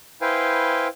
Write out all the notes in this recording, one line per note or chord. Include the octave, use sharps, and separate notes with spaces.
E4 B4 C5 F5 G5 G#5